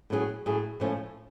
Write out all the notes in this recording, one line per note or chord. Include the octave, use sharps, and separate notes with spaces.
A2 F#3 C#4 G#4
A2 F#3 C#4 G#4
A2 F3 A3 C#4